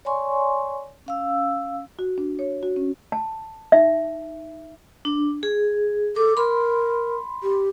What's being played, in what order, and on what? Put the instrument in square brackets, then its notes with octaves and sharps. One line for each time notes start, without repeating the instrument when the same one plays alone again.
[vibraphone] C#5 D5 G#5 C6 C#6
C#4 F5 E6
[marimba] F#4
D4
C#5
F#4
C#4
[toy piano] A5
D#4 E5
[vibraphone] D4
G#4
[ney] A4 [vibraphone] D6
[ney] A#4 [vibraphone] B5 C6
[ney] G4